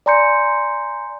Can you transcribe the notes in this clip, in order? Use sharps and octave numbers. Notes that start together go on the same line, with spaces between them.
D5 G#5 A#5 C6 G6 C#7